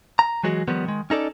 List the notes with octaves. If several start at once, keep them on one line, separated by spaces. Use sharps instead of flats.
A#5
E3 F#3 G#3 F#4
D#3 F3 G3 B3
D#3 G#3
C#4 D#4 A4 D5